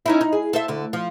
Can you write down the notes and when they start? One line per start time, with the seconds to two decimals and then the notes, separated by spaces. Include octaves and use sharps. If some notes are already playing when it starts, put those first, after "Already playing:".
0.06 C#4 D#4 E4
0.21 D#4
0.33 G#4
0.53 A4 C5 E5
0.68 D2 D3
0.93 F3